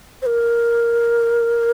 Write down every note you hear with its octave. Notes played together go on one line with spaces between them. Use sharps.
C5
A#4